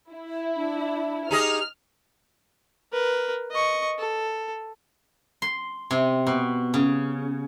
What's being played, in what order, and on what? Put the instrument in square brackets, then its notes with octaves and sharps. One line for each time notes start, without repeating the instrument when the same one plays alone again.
[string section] E4
[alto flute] D4
[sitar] D#4 G#4 D#5 [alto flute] G4 [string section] F6
[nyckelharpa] A#4 B4
D#5 C#6
A4
[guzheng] C6
C3
B2
C#3